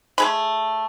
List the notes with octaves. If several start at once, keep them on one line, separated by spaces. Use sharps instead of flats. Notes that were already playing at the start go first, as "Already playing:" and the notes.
A3 G#4 B5